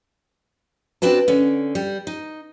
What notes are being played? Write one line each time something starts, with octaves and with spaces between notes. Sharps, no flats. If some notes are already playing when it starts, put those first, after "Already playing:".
C4 D4 F#4 B4 A5
D3 C#4
G3
D#4